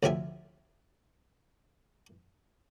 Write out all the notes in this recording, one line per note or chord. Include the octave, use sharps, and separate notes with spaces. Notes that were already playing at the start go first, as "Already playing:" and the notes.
D2 D3 F3 G4 E5 G#5